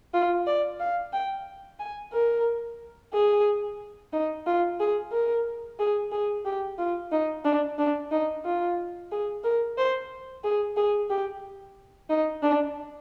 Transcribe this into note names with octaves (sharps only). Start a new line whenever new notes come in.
F4
D5
F5
G5
G#5
A#4
G#4
D#4
F4
G#4
A#4
G#4
G#4
G4
F4
D#4
D4
D4
D#4
F4
G#4
A#4
C5
G#4
G#4
G4
D#4
D4